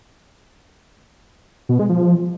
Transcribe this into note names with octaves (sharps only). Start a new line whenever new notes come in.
B2
G#3
F3